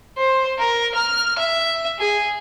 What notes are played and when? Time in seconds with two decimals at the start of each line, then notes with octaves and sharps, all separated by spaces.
0.17 C5
0.59 A#4
0.95 F6
1.38 E5
2.00 G#4